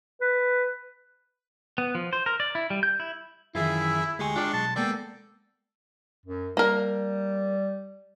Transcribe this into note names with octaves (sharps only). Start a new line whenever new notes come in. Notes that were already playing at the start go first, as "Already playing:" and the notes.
B4
B3
F3
C5
A#4
D5
E4
G3
G6
E4
F#2 D#3 E3 E4 F4 G#4 E5
D2 G#3 G4 G#5 C6 C#6
D4 F4 G4 D5
B1 A5
G#3 A#3 B3 A4 D5 G5
F#2
G3 A#3 A#4